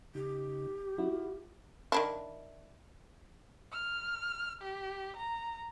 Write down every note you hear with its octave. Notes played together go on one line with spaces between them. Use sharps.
C#3 D#4 G4
F#3 C#4 D#4 E4 F#4
F4
D#3 D4 E4
F6
G4
A#5